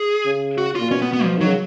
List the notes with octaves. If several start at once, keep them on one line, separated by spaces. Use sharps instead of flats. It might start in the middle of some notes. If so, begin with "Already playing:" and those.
Already playing: G#4
C#3
F#4
A#2 F4
B2 C#4
B3
B3
F3
D#3 F#3
C#3